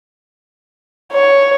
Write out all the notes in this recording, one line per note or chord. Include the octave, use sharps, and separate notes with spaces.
C#5